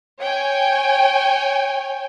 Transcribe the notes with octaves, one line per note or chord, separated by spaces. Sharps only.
C#5 G5 G#5